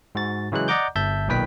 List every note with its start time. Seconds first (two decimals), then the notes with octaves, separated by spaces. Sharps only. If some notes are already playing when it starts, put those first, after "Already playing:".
0.15 G#2 F#4 A6
0.52 C#3 E3 F#3 G#3 F#6
0.68 D5 D#5 F#5 A#5 D6 G6
0.96 G1 E5 A5 G6
1.28 B1 A#2 D#3 B4 G5 B6